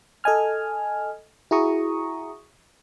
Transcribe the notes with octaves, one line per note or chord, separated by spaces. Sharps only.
A4 D#5 G#5 F6
E4 F#4 G#4 A#5 C#6 D#6